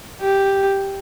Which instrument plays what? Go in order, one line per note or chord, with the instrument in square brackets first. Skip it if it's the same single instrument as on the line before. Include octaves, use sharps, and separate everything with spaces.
[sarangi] G4